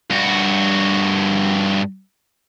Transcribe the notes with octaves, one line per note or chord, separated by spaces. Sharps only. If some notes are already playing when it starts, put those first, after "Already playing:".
G2 F#4